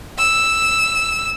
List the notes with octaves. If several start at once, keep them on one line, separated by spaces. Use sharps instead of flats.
E6